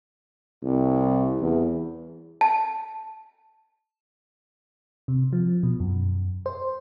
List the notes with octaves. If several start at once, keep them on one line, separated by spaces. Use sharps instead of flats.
C2
E2
A5
C3
F3
B2
F#2
C5